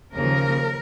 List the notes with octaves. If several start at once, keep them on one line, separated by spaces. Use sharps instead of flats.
D#2 C#3 F3 A#3 A#4